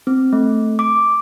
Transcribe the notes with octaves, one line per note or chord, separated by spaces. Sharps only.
C4
A3
D6